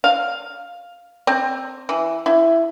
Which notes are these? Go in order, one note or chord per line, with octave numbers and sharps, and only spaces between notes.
F5
C4
E3
E4